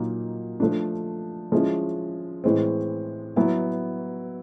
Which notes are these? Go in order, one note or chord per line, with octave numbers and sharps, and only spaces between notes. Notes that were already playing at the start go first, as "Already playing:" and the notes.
Already playing: A#2 F#3 A#3 D#4
F3 A3 D4
F3 G#3 C#4 E4
A2 E3 G#3 C4
F#3 B3 E4